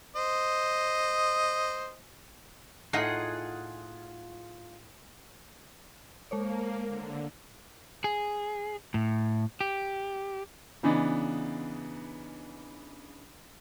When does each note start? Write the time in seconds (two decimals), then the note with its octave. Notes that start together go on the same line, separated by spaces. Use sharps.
0.16 C5 D#5
2.93 A2 D#4 F4 G#4 F#5
6.31 G#3 A#3 C5 C#5
6.88 D3
8.04 G#4
8.94 A2
9.61 G4
10.83 C#3 E3 B3 D4 D#4